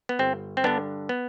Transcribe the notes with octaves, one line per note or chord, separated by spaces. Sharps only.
B3
G1 C4
C4
G2 D3 B3 D4
B3